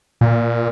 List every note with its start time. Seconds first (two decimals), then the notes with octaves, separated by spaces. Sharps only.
0.21 A#2